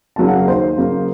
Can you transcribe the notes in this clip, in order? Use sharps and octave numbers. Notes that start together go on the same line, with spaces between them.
C#3 F#3 A#3 A5
F#5
F5
D#2 C5 D#5
C#3 F#3 A#3